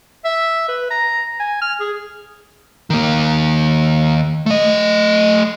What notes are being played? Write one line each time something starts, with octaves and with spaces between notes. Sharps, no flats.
E5
B4
A#5
G#5
F6
G#4
D#3 A#3
A3 D#5